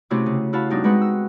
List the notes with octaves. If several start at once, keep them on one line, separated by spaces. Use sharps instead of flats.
C3 A3 C4 C#4 E4 F#4
C#3
E4 F#4 F5 A5 B5
G2 B3 D4 D#4 F#4
G#3 C4 B4 F#5 C#6
E6